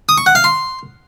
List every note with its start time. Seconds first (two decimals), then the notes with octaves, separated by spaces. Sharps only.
0.09 D#6
0.18 C#6
0.26 F#5
0.35 F5
0.44 C6